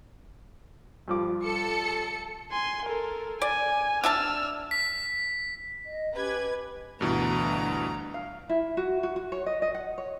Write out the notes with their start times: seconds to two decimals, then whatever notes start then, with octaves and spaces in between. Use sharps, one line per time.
1.08 G2 F3 D6
1.43 A4 C#7
2.52 G#5 C6
2.85 A4 A#4
3.42 D5 G#5
4.04 D4 E5 A5 E6 F6
4.71 B6
5.85 D#5
6.14 C#4 G4 B4 G#6
7.01 D2 G2 B2 E3 A#5
8.14 F5
8.49 E4
8.77 F#4
9.03 F#4
9.16 F#4
9.32 C#5
9.46 D#5
9.62 D#5
9.75 F#5
9.98 C#5